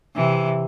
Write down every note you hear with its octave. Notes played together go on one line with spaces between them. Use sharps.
C3 E3